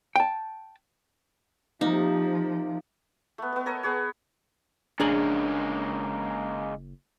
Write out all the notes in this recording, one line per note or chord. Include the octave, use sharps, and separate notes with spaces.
G5 A5
C3 F3 A#3 D#4
A3 B3
B3 D#5
A4 A#4 C#5 D#5
B3 G#4 C#5
F#1 G#3 A#3 C#4 D4 G#4 A#5